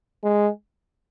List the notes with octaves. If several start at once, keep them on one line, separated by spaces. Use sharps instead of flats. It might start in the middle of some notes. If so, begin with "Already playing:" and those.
G#3